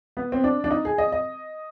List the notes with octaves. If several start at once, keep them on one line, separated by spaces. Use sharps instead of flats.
B3
C4
D4
D4
D#4
G#4
D#5
D#5